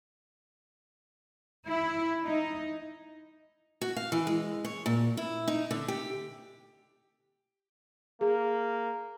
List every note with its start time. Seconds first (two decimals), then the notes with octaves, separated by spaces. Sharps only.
1.67 E4
2.24 D#4
3.81 F#4
3.97 F5
4.12 E3
4.27 G#3
4.65 C#5
4.86 A#2
5.17 E4
5.48 D#4
5.71 D3
5.88 G4
8.21 A#3 G#4